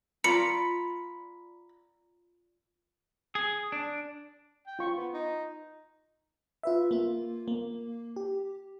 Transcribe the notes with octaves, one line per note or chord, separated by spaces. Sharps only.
F4 D5 A#5 B5 C#7
G#4
D4
G5
F4 C#6
B3
D#4
F4 B4 E5
A#3 F4
A#3
G4